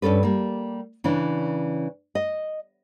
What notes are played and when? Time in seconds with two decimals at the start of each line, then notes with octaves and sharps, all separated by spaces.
0.02 G2 B2 C#4 A4 B4
0.23 G3 A#3
1.04 C#3 E3 C#4 D4
2.15 D#5